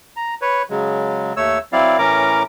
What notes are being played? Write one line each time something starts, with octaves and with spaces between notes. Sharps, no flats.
A#5
B4 C#5
C#3 F#3 G#3
D#2 A3 C#5 E6
F#3 C4 E4 D5 F5
A2 E3 C#4 A#4 A#5 D6